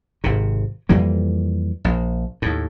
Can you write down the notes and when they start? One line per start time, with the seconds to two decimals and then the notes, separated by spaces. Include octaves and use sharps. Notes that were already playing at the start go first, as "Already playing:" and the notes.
0.24 G#1 C3
0.89 F2 E3 G3 A#3
1.85 A#1
2.42 D#2 A2